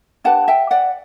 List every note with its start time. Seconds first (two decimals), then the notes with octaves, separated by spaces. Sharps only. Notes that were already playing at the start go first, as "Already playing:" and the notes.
0.24 D4 G4 B4 F#5 A5
0.48 E5 G5
0.71 D5 F#5